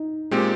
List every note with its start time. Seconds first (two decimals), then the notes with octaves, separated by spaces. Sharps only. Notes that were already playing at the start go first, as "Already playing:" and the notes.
Already playing: D#4
0.31 A#2 G#3 C4 G4